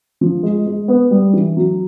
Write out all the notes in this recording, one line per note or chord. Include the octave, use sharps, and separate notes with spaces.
F3
G#3
G#3
B3
G3
E3
F#3